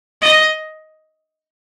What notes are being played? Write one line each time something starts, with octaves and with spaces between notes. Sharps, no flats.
D#5